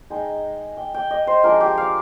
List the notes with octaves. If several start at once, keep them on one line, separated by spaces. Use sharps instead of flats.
G#3 D#4 G5
G5
G5
D#5
C5
F3 G#3 D4 A#4
G4
F5